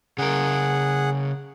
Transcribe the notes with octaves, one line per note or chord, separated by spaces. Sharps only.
C#3 G#4 A#4 F#5